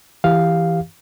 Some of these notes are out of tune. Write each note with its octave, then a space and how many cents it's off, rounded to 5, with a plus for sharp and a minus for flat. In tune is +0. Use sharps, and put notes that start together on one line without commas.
E3 +0 G4 +5 F5 +0